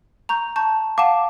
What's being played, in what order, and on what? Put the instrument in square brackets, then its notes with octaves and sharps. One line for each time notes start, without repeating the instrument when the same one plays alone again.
[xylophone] A#5 C#6 G6
A5 C#6 G6
[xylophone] F5 F#5 E7 [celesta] A5 D6